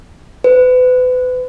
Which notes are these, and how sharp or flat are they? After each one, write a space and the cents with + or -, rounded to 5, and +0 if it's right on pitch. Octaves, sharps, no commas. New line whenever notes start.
B4 +35